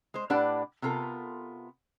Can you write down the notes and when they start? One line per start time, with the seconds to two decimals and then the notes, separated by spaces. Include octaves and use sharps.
0.14 G#3 C5
0.30 A2 D4 G4 B4 D5 F#5
0.82 C3 B3 F4 A4 A#4